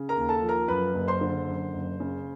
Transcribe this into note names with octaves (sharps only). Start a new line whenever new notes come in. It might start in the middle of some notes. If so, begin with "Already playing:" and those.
Already playing: C#3
A#4 A#5
D#2
A4 A5
F3
A#4 A#5
F#2 B4 B5
F#1
C5 C6
D3
F#2
F#1
C#3